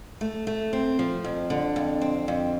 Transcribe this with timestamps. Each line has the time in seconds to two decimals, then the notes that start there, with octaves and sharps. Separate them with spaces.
0.21 A3
0.47 A3
0.73 C4
0.99 F3
1.24 F2
1.50 D3
1.76 F2
2.01 C4
2.28 F2